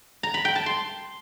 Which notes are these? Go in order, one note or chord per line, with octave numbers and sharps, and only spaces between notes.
A#5
B5
G5
A5
C6